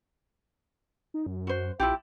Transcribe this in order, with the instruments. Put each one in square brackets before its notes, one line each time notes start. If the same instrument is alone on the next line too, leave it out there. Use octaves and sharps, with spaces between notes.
[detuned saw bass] D#4
F#2
[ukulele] F#4 C5
[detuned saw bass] A#1 [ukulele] E4 F4 G4